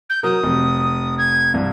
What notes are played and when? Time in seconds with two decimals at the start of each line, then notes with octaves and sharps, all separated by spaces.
0.09 G6
0.23 F#3 A#4 D#6
0.43 F1
1.18 G#6
1.54 C2 G2